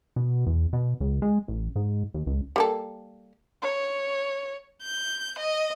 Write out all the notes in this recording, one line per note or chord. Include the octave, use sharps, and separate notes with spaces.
B2
E2
B2
C#2
G#3
A1
G#2
D#2
C#2
G3 A#3 A4
C#5
G6
D#5